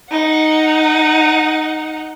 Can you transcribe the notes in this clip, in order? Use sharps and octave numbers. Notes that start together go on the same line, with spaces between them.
D#4 F#5